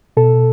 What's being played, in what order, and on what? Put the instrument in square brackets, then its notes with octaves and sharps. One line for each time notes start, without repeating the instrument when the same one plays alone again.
[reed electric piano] B2 A4